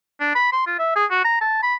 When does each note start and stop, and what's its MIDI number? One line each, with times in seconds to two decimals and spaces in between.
0.20 0.35 62
0.35 0.48 83
0.52 0.66 84
0.66 0.78 65
0.79 0.92 76
0.96 1.05 68
1.11 1.23 66
1.24 1.38 82
1.41 1.62 81
1.63 1.75 83